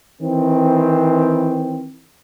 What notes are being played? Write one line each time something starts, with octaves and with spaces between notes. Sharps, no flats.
D#3 E3 C4